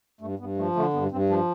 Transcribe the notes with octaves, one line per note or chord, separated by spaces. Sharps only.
G2 A3
G2 B3
F3 A3
D3 A3
G2 B3
G2 C4
F3 D4